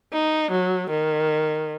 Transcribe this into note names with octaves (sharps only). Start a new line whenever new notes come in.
D#4
F#3
D#3